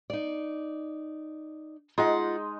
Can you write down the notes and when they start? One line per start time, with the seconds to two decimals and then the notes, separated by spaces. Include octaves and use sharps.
0.10 D#4 D5
1.98 G#3 D#4 F4 F#5